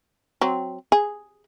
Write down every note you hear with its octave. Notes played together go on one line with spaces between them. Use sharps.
F#3 C4
G#4